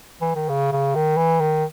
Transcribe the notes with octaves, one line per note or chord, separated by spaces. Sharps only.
E3
D#3
C#3
C#3
D#3
E3
D#3